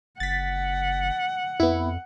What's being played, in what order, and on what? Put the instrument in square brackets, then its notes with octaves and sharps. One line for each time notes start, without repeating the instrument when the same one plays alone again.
[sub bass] F#1 [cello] F#5 [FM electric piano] A6 B6
[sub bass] F2 [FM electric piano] B3 E4